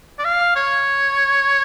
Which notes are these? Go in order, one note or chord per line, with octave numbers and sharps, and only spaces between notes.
D5
F5
C#5